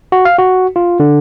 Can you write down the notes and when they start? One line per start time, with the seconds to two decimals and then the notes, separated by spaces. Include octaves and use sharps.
0.12 F#4
0.25 F5
0.39 F#4
0.76 F4
1.00 D3